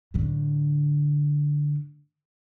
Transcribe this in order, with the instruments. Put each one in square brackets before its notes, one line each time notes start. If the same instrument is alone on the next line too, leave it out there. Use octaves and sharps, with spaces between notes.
[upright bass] A2 D3